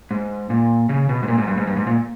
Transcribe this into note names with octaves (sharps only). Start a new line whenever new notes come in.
G#2
A#2
C#3
B2
G#2
A#2
G#2
G2
G#2
G2
G#2
A#2